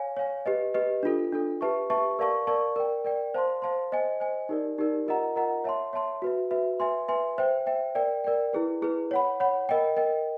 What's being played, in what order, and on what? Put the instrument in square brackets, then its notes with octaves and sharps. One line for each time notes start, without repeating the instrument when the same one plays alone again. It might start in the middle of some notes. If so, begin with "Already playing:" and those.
Already playing: [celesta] C#5 F5 G#5
C#5 F5 G#5
G4 B4 D#5
G4 B4 D#5
D4 F4 A4
D4 F4 A4
G4 B4 E5 A5 C#6
G4 B4 E5 A5 C#6
A#4 D5 F5 A5 C#6
A#4 D5 F5 A5 C#6
A#4 D5 G5
A#4 D5 G5
C5 F5 A5 C6
C5 F5 A5 C6
C5 D#5 G#5
C5 D#5 G#5
D#4 G4 A#4 D5
D#4 G4 A#4 D5
F4 A#4 D#5 F#5 A#5
F4 A#4 D#5 F#5 A#5
C#5 E5 A5 C6
C#5 E5 A5 C6
F#4 B4 E5
F#4 B4 E5
B4 E5 G#5 C6
B4 E5 G#5 C6
C5 E5 G5
C5 E5 G5
A#4 D5 G5
A#4 D5 G5
E4 G#4 B4
E4 G#4 B4
C#5 F#5 B5
C#5 F#5 B5
A#4 D#5 G5
A#4 D#5 G5